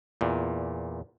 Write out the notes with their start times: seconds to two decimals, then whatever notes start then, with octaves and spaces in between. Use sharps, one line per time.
0.21 E2 A#2